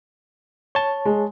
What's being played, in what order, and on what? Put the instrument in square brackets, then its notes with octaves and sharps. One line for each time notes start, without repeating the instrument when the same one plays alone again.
[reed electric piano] C#5 A5 [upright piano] G7
[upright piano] G#3